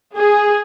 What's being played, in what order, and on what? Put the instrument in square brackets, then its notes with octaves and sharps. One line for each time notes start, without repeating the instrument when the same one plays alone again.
[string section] G#4